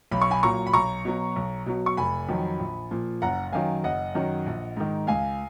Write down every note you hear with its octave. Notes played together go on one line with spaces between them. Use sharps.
B1 B5
C#6
G#5 B5
A#2 F#3 A#5 C#6
B5
B1 A#5 C#6
B2 F#3
B1
B2 F#3
C#6
F1 G#5 B5
F2 D#3 F#3
A#1
A#2 F3
F#1 F#5 A#5
F#2 D#3 F#3 F5 G#5
F#1 D#5 F#5
F#2 D#3 F#3
A#1
G#2 D#3
C#2 F5 G#5